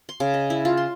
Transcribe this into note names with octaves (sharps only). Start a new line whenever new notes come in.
C6
C#3
D#5
E4
F4
C6